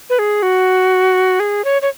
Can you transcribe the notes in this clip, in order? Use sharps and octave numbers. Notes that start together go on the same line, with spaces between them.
B4
G#4
F#4
G#4
C#5
C#5